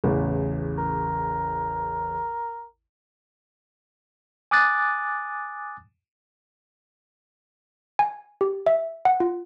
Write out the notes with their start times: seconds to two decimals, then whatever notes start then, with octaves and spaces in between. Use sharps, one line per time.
0.04 A1 E2 C#3
0.78 A#4
4.51 G#5 D6 D#6 F#6 A6
7.99 G#5
8.41 G4
8.67 E5
9.05 F#5
9.20 F4